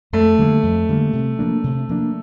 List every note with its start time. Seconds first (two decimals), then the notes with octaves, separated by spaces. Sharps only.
0.13 F2 A3
0.38 D3 G3 A#3
0.63 F2
0.89 D3 G3 A#3
1.13 C3
1.39 F3 A#3 D4
1.64 C3
1.89 F3 A#3 D4